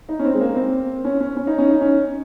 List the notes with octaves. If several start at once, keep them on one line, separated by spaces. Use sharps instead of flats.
D#4
C#4
C4
G#3
A#3
C4
C#4
C#4
C#4
D#4
C#4
D#4
C#4